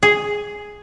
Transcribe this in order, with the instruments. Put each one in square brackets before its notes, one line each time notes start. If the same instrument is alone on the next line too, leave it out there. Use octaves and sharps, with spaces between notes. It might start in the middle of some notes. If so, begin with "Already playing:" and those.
[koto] G#4